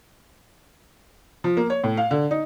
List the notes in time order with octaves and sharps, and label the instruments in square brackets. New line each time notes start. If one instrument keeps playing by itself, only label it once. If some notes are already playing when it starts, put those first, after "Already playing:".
[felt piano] F3
A#3
C#5
A2
F5
D3
D#4